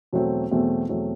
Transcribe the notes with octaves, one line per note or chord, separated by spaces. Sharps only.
E2 B2 F#3 A3 C4
E2 B2 F#3 A3 C4
E2 B2 F#3 A3 C4